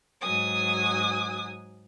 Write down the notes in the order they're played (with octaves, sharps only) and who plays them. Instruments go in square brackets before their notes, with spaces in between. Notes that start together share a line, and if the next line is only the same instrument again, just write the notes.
[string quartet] G#2 F#3 G#5 D#6